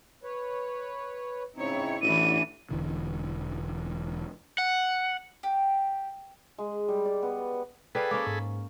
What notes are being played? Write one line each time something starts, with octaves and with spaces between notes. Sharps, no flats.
B4 C#5
C#3 C4 D#4 E4 C#5
A1 E3 D4 E4 F#4 D5 D#7
E1 D3 E3
F#5
G4
G#3
G3
D5
B3
G#4 A4 B4 D5 F5 G5 B5
A#3 C#4 D6
G#2